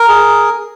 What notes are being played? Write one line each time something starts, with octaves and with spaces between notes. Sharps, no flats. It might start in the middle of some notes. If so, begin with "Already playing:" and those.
Already playing: A#4
G#4